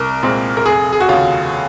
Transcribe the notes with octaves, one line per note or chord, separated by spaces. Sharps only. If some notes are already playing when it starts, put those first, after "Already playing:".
Already playing: C2 A#4
A#2 G#3 C4
A#4
F1 G#4
G#4
F#4
D#2 C#3 F4